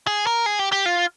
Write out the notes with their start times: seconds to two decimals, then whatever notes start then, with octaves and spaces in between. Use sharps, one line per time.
0.07 G#4
0.27 A#4
0.46 G#4
0.59 G4
0.72 G4
0.86 F4